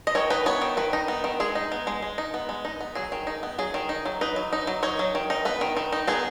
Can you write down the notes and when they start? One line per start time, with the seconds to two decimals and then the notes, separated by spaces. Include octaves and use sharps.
0.07 D#5
0.15 D#3 C#5
0.30 D#4 B4
0.46 B3 C#5
0.62 D#3
0.77 D#3 B4
0.93 D#4
1.08 B3
1.24 D#3
1.40 G#3 G#4
1.55 D#4
1.72 B3
1.87 G#3
2.02 G#3
2.18 D#4
2.34 B3
2.49 G#3
2.65 D#4
2.81 B3
2.95 F#3 G#4
3.12 D#3
3.27 D#4
3.43 B3
3.58 F#3 G#4
3.74 D#3
3.89 D#4
4.06 F#3
4.21 D#4 B4
4.36 F#3
4.53 D#4
4.67 F#3
4.83 D#4 C#5
4.99 F#3
5.15 D#3
5.30 D#4
5.45 B3 B4
5.61 D#3
5.77 D#3
5.92 D#4
6.07 B3 G#4